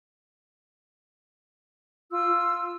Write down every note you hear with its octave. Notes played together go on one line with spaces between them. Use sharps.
F4 E6